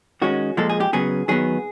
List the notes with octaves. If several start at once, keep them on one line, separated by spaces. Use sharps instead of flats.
D#3 G#3 C#4 F#4
A#2 F3 G#3 A4
G#4
G4
C#3 F#3 B3 G#4
D#3 F#3 B3 G#4